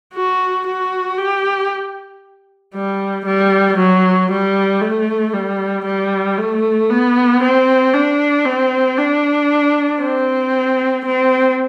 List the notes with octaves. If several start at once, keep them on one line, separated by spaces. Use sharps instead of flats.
F#4
F#4
G4
G3
G3
F#3
G3
A3
G3
G3
A3
B3
C4
D4
C4
D4
C4
C4